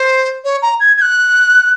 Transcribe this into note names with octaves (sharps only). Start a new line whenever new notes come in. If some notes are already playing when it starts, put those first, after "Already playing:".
Already playing: C5
C#5
A#5
G#6
G#6
F#6